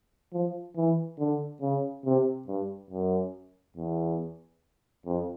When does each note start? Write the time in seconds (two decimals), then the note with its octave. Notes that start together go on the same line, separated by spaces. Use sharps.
0.33 F3
0.76 E3
1.19 D3
1.61 C#3
2.05 C3
2.47 G2
2.90 F#2
3.77 E2
5.06 F2